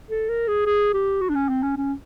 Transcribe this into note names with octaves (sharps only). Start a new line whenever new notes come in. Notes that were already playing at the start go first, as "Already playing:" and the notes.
A4
A#4
G#4
G#4
G4
F#4
D4
C#4
C4
C#4
C#4